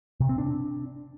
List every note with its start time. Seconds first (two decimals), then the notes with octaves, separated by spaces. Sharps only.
0.20 C3
0.29 C4
0.38 D4